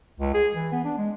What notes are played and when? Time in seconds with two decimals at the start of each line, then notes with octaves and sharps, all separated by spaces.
0.20 C#2
0.34 G#4
0.54 E3
0.72 B3
0.84 D4
0.98 G#3